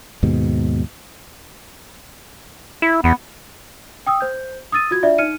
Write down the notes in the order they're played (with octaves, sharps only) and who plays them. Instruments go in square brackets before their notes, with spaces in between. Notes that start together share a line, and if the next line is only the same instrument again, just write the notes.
[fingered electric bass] D#2 G#2 B2
[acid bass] E4
[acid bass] E2 [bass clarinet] B3
[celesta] G5 D#6 E6
C5 G6
D#6 E6 A6 D#7
F4 F#4 G#6
D4 F4 D5 E5
D#4 F6 C#7 D#7